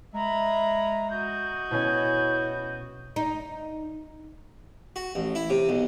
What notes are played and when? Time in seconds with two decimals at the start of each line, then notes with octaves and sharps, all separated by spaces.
0.14 G#3 E5 A#5 B5
1.10 F#4 D#5 G6
1.71 B2 C#4 E4 G#5
3.16 D#4
4.96 F#4
5.15 A1
5.35 E4
5.50 C3
5.69 B1